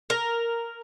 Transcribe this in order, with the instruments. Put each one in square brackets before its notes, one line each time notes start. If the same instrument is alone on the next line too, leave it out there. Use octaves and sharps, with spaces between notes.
[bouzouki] A#4